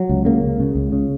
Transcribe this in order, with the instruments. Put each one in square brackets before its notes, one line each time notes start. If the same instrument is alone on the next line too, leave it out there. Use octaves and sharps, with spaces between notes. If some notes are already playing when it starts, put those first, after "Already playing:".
Already playing: [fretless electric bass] F#3
C#2
C#3 A#3
C#2
C#3
C#2
C#3